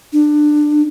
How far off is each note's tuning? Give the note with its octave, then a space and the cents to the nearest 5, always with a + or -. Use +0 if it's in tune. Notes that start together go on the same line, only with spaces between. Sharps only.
D4 +20